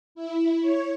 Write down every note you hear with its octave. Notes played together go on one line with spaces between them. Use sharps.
E4
C#5